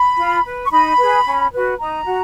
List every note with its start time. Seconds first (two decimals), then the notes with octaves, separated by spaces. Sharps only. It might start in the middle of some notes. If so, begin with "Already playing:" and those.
Already playing: B5
0.17 F4
0.44 B4
0.66 C#6
0.71 D#4 B5
0.98 G#4 B4
1.25 C#4
1.53 F#4 B4
1.79 D#4 A#5
2.06 F#4